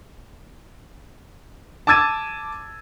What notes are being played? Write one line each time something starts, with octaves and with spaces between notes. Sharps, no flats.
A5 D6 E6 G#6 A6 D#7